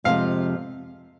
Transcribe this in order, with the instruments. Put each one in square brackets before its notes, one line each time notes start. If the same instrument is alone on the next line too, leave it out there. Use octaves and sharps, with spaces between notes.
[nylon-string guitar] F2 C3 F3 G#3 F4 [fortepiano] F5